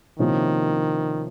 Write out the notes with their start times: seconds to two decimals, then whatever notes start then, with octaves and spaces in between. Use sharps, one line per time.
0.19 C3 D#3 F3 A#3 C#4 E4